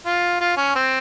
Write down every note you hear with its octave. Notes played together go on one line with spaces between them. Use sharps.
F4
F4
C#4
C4